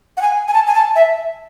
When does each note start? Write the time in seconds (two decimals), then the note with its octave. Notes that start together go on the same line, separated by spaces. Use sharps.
0.17 F#5
0.22 G#5
0.48 G#5
0.54 A5
0.67 G#5
0.75 A5
0.96 E5